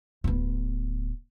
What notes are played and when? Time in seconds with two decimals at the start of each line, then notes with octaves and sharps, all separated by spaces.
0.24 D1 B3